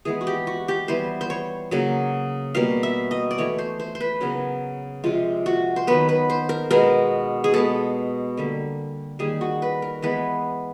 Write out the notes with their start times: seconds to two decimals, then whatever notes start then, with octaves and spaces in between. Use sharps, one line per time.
0.05 E3 G#3 B3 G#4
0.21 F#4
0.27 G4
0.47 F#4
0.68 G4
0.88 E3 G3 B3 C5
1.21 C5
1.30 C#5
1.71 C#3 F#3 A#3
2.55 B2 G3 A#3 F5
2.83 E5
3.11 D#5
3.31 D5
3.38 E3 A3 C#5
3.58 C5
3.80 C5
3.95 C5
4.00 B4
4.21 C#3 F#3 B3 A#4
5.04 C3 F3 G#3 F4
5.46 F#4
5.76 C5
5.87 D#3 F#3 B3 B4
6.09 B4
6.30 C5
6.49 A#4
6.70 B2 G#3 B3 A#4
7.44 G#4
7.54 B2 G#3 B3 A4
8.37 D3 G3 A#3
9.19 D#3 G3 A#3 G#4
9.41 F#4
9.62 B4
9.82 A#4
10.02 E3 G#3 B3 B4